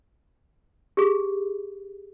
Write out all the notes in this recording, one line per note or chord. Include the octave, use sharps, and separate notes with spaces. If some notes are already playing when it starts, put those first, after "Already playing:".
G4 G#4